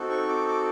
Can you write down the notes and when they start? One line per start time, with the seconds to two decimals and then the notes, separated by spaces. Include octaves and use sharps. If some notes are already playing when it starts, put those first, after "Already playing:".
Already playing: C4 D#4 F#4 A4
0.10 C#6
0.28 D6
0.48 D6